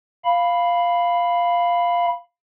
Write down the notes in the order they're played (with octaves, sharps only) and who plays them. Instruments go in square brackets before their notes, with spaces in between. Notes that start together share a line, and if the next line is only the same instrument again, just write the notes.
[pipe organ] F5 B5